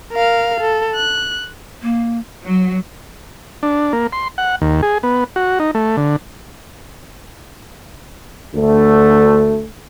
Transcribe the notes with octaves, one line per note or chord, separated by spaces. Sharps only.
A#4 F5
A4
F#6
A#3
F#3
D4
A#3
C6
F#5
D#2
G#4
B3
F#4
D#4
A3
D3
D2 A3